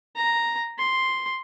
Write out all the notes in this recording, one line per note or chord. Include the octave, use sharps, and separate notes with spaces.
A#5
C6